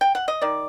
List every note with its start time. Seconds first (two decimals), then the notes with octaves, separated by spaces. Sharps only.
0.01 G5
0.15 F#5
0.28 D#5
0.41 D#3 D5